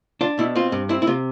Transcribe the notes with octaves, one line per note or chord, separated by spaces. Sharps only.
D4 F4
B2 E4
C4 F4
G2
C4 E4
E4
C3 F4